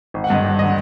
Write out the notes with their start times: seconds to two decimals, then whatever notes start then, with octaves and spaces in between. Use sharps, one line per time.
0.14 G#1
0.24 F#5
0.30 G2 D3 D#5
0.44 G#1
0.59 D3 D#5